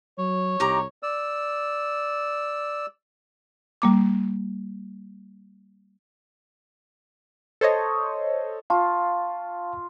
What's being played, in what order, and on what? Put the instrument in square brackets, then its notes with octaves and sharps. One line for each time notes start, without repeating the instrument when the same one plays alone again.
[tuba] F#3 [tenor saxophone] C#5
[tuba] C2 [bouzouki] D#4 G4 A#5 [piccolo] D6
[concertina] D5 E6
[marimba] G3 A#3 D6
[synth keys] A4 C5 C#5 D#5
[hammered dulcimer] F4 [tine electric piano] F5 A5 C#6